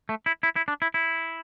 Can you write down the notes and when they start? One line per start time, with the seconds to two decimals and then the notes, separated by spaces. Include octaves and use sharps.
0.09 A3
0.26 E4
0.43 E4
0.56 E4
0.68 D4
0.82 E4
0.94 E4